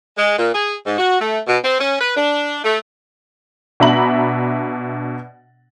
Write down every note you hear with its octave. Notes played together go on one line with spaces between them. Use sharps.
G#3
A#2
G#4
G#2
F#4
A3
B2
C4
C#4
B4
D4
A3
B2 D4 E5 A#5 B5 F#7